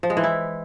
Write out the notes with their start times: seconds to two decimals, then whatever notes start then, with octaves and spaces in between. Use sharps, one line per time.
0.03 F3
0.10 G#3
0.17 E3
0.24 E4